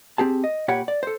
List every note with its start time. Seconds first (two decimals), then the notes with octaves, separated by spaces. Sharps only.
0.18 C4 G4 G#4 A5
0.44 D#5
0.68 A#2 G4 C#5 F#5 B5
0.88 D5
1.03 A4 C5